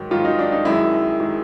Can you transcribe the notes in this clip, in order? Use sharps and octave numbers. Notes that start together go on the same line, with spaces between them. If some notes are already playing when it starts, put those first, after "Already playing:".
Already playing: G#2 D#3 F#3
G#2 D#3 F#3 F4
D#4
D4
D#4
F#2 D#3 G#3 E4
D#3 G#3